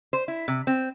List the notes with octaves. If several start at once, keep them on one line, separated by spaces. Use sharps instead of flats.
C5
E4
C3
C4